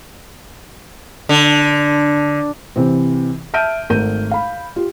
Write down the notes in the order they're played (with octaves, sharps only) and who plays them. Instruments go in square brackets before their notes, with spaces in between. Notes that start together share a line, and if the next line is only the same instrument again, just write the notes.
[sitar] D3
[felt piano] C3 E3 C4
E5 A5 F6 G6 D7 D#7
G#1 A3 A#4 G6 D#7
F5 B5
F4 G4